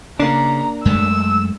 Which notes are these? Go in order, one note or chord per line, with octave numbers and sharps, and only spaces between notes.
C#3 A#3 D4 A#5
F#2 G#3 A3 E6